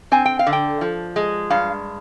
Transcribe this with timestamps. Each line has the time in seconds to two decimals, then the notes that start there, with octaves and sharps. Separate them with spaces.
0.12 C4 G#5
0.25 G5
0.39 F5
0.47 D3
0.53 G5
0.81 F3
1.16 G#3
1.50 G2 F5